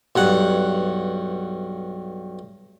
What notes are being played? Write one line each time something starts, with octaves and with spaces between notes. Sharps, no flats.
B1 G2 F#5